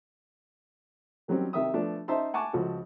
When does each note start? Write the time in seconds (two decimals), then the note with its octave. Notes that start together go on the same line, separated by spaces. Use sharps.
1.28 D#3 F#3 G3 C4 C#4
1.53 C3 D#3 E5 D#6
1.74 F3 A3 B3 D4
2.08 C#4 D#4 C5 E5 A5 C6
2.34 F#5 G#5 A5 C#6 D6
2.53 C#2 F3 F#4 A4